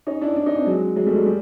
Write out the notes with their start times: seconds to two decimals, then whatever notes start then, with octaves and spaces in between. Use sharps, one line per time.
0.07 C#4 D#4
0.21 D4 E4
0.36 D4 E4
0.46 C#4 D#4
0.56 C4 D4
0.66 F#3 G#3
0.96 F#3 G#3
1.06 G3 A3
1.16 F#3 G#3
1.26 G3